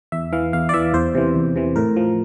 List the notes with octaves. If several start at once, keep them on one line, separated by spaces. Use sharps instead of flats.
E2 E5
E3 F5
E2 F5
D5
E3 E5
E2 C5
C3 E3
E2
C3 E3
A2 A#4
F3